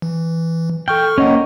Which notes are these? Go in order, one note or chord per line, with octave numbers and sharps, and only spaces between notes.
E3
A4 G5 C#6 F6
A#3 C#4 C#5 D#5 F#5